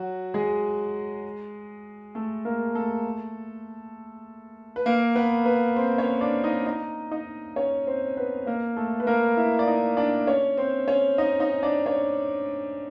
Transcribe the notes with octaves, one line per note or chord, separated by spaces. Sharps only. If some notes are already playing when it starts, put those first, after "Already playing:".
Already playing: F#3 F#4
G#3 G#4
A3 A4
A#3 A#4
A3 A4
B4
A#3 A#4
B3 B4
B3 B4
C4 C5
C#4 C#5
D4 D5
D#4 D#5
D#4 D#5
D#4 D#5
C#4 C#5
C4 C5
B3 B4
A#3 A#4
A3 A4
B4
A#3 A#4
E4 E5
D5
D#4 D#5
D4 D5
C#4 C#5
C4 C5
C#4 C#5
D#4 D#5
D#4 D#5
D4 D5
C#4 C#5